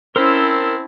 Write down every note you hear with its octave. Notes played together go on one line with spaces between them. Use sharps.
C4 C#4 E4 A#4 C5 A5 E6